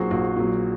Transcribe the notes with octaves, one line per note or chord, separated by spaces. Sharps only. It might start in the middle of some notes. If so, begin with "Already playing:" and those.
Already playing: A#1 A#2 F#3 F#4 G#4 C5
A#1 F#4
A#2 F#3